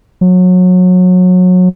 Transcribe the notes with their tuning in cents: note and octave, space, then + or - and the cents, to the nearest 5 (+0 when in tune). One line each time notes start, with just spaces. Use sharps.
F#3 -25